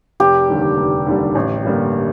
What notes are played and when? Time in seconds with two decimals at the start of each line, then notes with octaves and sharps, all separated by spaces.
0.20 F1 G4
0.49 D#2 D3 G3
0.78 F1
1.07 D#2 D3 G3
1.35 A1
1.64 G2 D3 G3 A#3